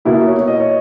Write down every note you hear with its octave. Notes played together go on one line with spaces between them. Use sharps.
B2 A#3 E4 B4
C#5
D#5
C#5